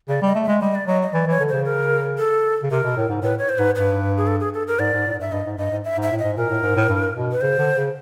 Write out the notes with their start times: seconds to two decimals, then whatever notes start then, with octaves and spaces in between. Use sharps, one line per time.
0.09 C#3 D5
0.22 G3 D#5
0.35 A3
0.44 G#3 E5
0.61 G3 D#5
0.75 D5
0.87 F#3 D#5
1.02 D#5
1.14 E3 D5
1.27 E3 C#5
1.40 D3
1.49 C#3 C5
1.65 A#4
2.18 A4
2.63 C#3
2.71 C3 A#4
2.84 B2
2.97 A2
3.09 G#2
3.22 A2 B4
3.39 C#5
3.49 C5
3.58 G#2 B4
3.76 G2 B4
4.17 G#4
4.27 A4
4.40 G#4
4.54 A4
4.67 A#4
4.79 G#2 D5
4.93 G#2
5.07 A2
5.13 G#2
5.19 G2 E5
5.32 G2 D#5
5.46 G#2
5.58 G2 D#5
5.71 G#2
5.85 E5
5.97 G#2
6.03 E5
6.11 A2
6.19 G#2 D#5
6.37 A#2 A#4
6.50 A2
6.63 G#2
6.76 A2
6.89 G2
7.15 B2
7.32 B4
7.41 C#3 C5
7.59 D3
7.77 C#3